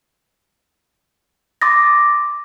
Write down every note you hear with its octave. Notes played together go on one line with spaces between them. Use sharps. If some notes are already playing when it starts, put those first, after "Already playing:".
C6 D6 D#6 A6 A#6